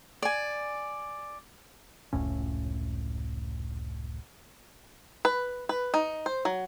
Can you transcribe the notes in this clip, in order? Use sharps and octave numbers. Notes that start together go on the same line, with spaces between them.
D5 G#5
F1 C#2 A2 C#4
B4
B4
D#4
C5
F#3